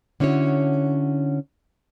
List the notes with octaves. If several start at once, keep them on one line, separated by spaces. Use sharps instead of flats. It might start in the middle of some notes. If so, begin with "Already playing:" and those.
D3 C#4 E4 F#4 C#5